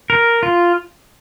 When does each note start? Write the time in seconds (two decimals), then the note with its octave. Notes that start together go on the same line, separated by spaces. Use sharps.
0.10 A#4
0.43 F4